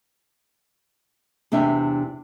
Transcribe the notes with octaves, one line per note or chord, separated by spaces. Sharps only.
E2 C3 D4 E5 G5